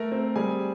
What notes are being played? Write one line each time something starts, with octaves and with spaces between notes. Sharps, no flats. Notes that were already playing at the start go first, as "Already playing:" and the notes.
Already playing: A3 A#4 A#5
C4
G3 G#4 G#5